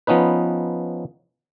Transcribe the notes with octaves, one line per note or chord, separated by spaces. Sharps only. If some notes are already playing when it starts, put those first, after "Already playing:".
F3 B3 C#4 D#4 B4